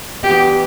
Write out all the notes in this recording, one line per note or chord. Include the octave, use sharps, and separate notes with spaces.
G2 E3 B3 G4